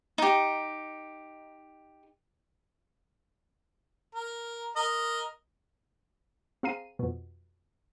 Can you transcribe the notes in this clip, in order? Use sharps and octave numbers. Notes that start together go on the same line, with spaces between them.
D#4 G4
A#4
A#4 D#5
C4 G#4 F5 A#5 C7 D#7
F2 B2